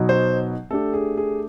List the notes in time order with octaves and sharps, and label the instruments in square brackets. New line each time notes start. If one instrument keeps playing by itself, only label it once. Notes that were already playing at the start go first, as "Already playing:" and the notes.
Already playing: [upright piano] B2 F#3 B3 D#4
[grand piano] C5
[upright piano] A3 D4 G4 [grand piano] A4
[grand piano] G#4
G#4